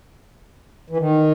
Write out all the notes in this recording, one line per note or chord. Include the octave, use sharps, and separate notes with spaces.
E3
D#3